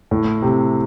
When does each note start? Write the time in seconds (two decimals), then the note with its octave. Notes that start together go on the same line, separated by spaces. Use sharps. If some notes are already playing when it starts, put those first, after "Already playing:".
0.11 A2
0.42 C3